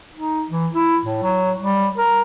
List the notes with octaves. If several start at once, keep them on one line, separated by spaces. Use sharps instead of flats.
D#4
E3
E4
A2
F#3
G3
A#4